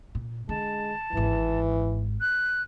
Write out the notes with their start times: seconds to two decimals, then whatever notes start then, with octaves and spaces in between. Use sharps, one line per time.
0.15 A#2
0.49 D3 G#3 A5
1.13 G#1 G#2 E3
2.21 F#6